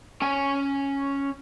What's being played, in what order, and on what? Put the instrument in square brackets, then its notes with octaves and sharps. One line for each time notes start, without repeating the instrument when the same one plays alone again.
[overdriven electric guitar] C#4 G#5